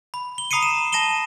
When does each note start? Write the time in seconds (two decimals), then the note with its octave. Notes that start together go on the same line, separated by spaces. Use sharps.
0.14 B5
0.38 G7
0.51 A#5 B5 D#6 C7 C#7 D#7
0.63 E7
0.92 A5 A#6 D#7 E7 G7